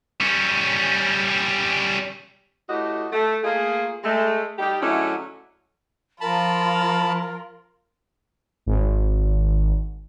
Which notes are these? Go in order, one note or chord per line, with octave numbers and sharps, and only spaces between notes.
G3 C#4
A2 A3 F#4 G4 D#5
A3
A3 A#3 F4 G#4
G#3 A3
G3 D#4 G4
D3 F#3 G#3 A3 C#4 E4
F3 F4 A#4 A5 B5
G#1